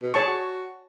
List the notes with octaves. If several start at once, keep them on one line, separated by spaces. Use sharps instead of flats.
B2
G#4 C#5 A5 C#6
F#4